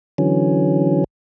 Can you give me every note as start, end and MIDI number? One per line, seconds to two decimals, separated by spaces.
0.18 1.04 50
0.18 1.04 52
0.18 1.04 54
0.18 1.04 61